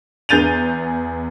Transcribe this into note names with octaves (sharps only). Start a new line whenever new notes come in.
E2 G#4 G6 A6 D#7 F7